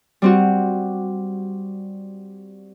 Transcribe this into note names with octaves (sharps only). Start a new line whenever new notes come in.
G3 C4 F#4